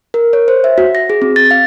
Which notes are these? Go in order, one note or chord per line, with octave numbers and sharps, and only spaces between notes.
A#4
C#5
C5
E5
F#4
A#6
G#4
C4
A6
F5